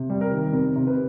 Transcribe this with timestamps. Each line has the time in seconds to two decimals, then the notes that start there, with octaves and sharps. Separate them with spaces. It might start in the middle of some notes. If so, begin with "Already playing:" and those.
Already playing: C3
0.10 G3
0.21 A#4
0.32 D#3
0.53 C3 A#4
0.76 C3
0.87 B4